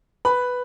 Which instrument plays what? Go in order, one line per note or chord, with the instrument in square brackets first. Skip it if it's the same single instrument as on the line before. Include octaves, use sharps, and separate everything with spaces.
[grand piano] B4 B5